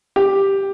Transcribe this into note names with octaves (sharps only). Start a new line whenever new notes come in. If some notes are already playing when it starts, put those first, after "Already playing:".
G4